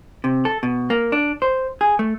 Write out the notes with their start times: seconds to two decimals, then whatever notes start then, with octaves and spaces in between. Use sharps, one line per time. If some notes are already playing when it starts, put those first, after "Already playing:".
0.24 C3
0.45 A4
0.63 B2
0.90 A#3
1.12 D4
1.42 C5
1.81 G#4
1.99 A3